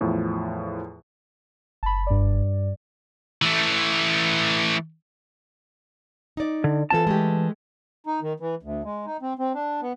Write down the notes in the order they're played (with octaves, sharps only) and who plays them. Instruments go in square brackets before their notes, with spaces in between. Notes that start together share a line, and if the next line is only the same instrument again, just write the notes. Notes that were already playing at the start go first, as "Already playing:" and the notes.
[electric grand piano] E2 A2 F3
[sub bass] F#1 [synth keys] A5 B5
[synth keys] G2 D5
[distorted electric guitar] E3 A3
[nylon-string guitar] D#4 D5
[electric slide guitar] D3
[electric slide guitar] E3 A5 [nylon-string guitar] C4 F4 A4
[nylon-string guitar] G#3 A3 G4
[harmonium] D#4
D#3
E3
D2
G#3
D#4
C4
C4
D4
B3